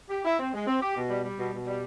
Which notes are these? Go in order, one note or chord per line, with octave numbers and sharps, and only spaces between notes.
G4
E4
C4
G#3
C4
G4
B2
G3
G3
B2
B2
G3